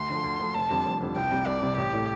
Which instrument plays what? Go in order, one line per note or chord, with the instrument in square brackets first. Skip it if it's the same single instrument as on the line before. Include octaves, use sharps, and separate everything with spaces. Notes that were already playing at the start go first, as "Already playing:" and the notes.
Already playing: [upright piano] D2 [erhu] C6
[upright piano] D3 F3 A3
D2
D3 F3 A3
[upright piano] F1 [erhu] A5
[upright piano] F2 D3 G3
F1
F2 D3 G3
[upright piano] C2 [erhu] G5
[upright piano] C3 G3
[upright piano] C2 [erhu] D5
[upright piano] C3 G3
[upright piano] A1 [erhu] G4
[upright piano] A2 A3